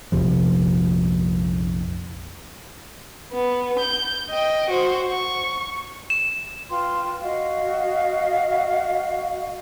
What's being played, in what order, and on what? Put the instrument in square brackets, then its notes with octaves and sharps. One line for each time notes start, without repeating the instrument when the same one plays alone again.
[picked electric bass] A#1 F2 C3 F3
[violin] B3
G6
D#5 G5
F#4 C5
C#6
[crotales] E7
[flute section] F4 B4 G5 C6
F#4 D#5 F5